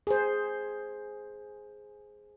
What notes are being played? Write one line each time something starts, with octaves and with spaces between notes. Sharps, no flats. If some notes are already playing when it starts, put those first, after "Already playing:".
G#4 C5